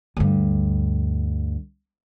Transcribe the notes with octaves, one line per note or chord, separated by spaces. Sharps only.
D2 G2